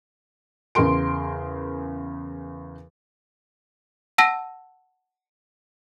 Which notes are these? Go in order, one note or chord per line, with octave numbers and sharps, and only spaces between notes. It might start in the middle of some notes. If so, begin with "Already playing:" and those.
E2 C#3 A#4 C6 D7
F#5 A5 E6 A#6 D#7